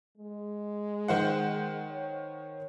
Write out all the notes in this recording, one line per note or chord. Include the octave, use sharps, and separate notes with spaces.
G#3
D#3 C5 F#5
C#5